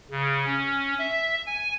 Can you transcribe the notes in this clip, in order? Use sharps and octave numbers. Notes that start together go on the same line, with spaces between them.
C#3
C#4
E5
G#5